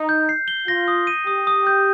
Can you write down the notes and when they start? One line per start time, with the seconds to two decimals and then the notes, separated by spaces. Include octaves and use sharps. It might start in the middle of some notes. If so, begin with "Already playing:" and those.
Already playing: D#4
0.09 G6
0.29 C7
0.48 G7
0.68 F4 A#6
0.88 D#6
1.07 D#7
1.27 G4 D#6
1.47 D#6
1.67 G6